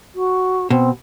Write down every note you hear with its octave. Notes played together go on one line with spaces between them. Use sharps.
F#4
B2 C4